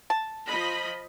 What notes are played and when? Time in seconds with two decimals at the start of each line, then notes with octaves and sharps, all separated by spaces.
0.10 A5
0.48 F3 D#5 B5